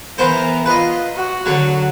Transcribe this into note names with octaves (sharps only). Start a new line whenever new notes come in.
E3 B3 A#4 C5
F4 B4 D#5
F#4
D3 F#3